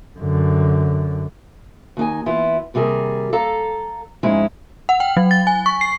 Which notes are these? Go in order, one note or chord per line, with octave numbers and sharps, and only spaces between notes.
F#2 D3
D#2 D#4 G#5
E3 B3 E4 F4
D#2 C3 G3 G#4 A#4
A4 F5 A#5
F2 G#2 G#3 C#4 D#4 E4
F#5
G5
F#3
A6
G#5
C#6
C7